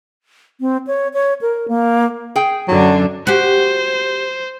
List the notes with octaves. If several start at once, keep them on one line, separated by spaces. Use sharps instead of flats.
C4
C#5
C#5
A#4
A#3
G#4 G5
F#2 D3 F#3 D4
F#4 G4 C5